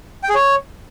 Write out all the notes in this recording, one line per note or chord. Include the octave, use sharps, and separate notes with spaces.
G5
G#4
C#5